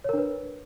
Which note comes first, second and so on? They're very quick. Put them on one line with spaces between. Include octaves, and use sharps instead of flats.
C#5 A#4 D4 B4